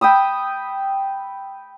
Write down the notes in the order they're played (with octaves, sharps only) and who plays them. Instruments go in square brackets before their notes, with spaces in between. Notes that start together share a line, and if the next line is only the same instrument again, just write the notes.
[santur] G5 B5 D#6 E6